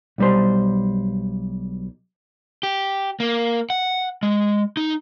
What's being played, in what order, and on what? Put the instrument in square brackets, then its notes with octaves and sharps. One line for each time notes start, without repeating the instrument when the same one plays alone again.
[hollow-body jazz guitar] B1 G3 C5
[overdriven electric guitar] G4
A#3
F#5
G#3
D#4